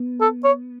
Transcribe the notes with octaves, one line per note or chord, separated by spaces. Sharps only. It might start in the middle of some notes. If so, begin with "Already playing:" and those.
Already playing: B3
A4
C#5